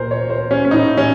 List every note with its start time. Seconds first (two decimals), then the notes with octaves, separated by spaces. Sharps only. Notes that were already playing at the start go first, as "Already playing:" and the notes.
Already playing: A#2 A#4 C5
0.11 C#5
0.30 C5
0.51 C#4
0.65 C#4
0.70 A2 D#4
0.97 C#4